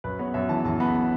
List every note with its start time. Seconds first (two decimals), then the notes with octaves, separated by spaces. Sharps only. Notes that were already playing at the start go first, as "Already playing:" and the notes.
0.04 F#2 B4
0.19 B3 C#5
0.34 F#2 E5
0.49 E3 A5
0.65 F#2 A5
0.80 B3 B5
0.95 B5